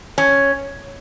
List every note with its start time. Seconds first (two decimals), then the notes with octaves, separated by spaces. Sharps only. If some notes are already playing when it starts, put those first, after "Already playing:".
0.18 C#4